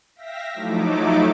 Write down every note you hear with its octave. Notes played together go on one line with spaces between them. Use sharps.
E5 F5 G5 A#6 B6
F3 F#3 A3 D#4 E4 D6